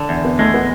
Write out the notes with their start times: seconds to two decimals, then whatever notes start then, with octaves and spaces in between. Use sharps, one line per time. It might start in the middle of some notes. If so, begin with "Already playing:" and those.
Already playing: D3
0.09 E2
0.24 B3
0.39 G#3 A3
0.54 B3